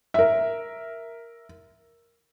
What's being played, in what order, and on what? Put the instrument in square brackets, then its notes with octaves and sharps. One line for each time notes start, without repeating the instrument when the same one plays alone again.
[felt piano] A#4 E5